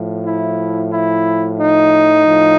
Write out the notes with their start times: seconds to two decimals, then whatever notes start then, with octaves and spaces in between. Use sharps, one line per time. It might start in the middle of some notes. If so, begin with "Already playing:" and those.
Already playing: A2 F3
0.24 E4
0.91 E4
1.57 D#4
2.24 A2 F3